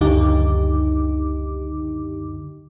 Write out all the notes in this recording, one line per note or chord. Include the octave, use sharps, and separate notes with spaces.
C#2 F#2 D3 D#4 G4 D6